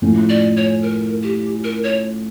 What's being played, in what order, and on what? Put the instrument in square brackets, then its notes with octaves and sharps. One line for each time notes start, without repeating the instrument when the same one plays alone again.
[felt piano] A2 F3 C#4 F4
[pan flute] D5
C#5
A#4
G4
A#4
C#5